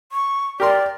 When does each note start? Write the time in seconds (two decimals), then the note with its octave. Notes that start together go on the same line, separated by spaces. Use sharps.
0.12 C#6
0.60 G4 A#4 D5 C6